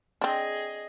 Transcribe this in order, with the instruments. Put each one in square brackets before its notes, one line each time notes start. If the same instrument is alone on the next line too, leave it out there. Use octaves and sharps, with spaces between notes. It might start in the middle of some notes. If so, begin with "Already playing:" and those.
[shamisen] C4 D4 [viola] G#4 D#5